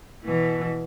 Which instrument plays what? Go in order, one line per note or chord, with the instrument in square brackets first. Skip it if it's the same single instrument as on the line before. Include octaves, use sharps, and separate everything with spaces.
[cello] B2 E3